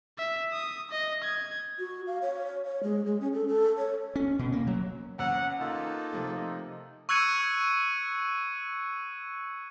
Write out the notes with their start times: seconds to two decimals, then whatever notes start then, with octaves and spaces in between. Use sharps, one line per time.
0.18 E5
0.52 D#6
0.91 D#5
1.24 G#6
1.78 F#4
2.07 F5
2.22 C#5
2.66 C#5
2.83 G#3
3.06 G#3
3.21 C#4
3.33 A4
3.48 A4
3.78 C#5
4.16 C#4
4.39 B2
4.52 A#3
4.67 F#3
5.19 E2 C#4 F#5 E6
5.60 A#3 D#4 F4 A4
6.13 C3 F3 A3
7.09 C#6 E6 F#6 G#6 C#7 D#7